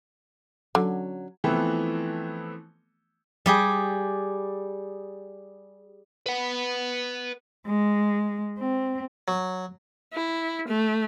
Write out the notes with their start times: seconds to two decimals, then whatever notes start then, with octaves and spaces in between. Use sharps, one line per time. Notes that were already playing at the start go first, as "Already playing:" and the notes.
0.75 D3 F#3 C#4
1.44 E3 F3 A3 B3 C4 E4
3.46 G3 G4 G#4
6.26 B4 F#5
7.66 G#3
8.58 C4
9.28 F#3
10.13 E4
10.67 A3